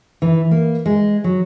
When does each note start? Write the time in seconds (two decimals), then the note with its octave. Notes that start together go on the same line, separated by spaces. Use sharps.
0.22 E3
0.51 A#3
0.86 G#3
1.24 F#3